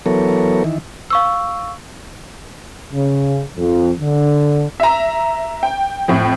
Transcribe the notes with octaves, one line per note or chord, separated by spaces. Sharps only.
E3 F#3 B3 A4 A#4 C#5
D#3 E3
F5 C#6 E6
C#3
F2
D3
E5 A#5
G5
F2 A2